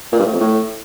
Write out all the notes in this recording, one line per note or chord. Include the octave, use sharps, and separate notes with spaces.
A#2
G2
A2
F2
A2